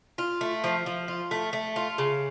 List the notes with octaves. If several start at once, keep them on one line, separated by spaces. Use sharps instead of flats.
F4
A3
F3
F3
F4
A3
A3
F4
C#3